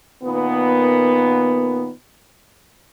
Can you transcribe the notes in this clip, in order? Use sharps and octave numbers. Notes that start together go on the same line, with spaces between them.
A#2 D#3 B3